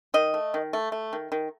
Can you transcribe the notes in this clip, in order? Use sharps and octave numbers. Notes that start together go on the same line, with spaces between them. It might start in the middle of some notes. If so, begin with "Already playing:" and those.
D#3 D#5
A3
D#3
A3
A3
D#3
D#3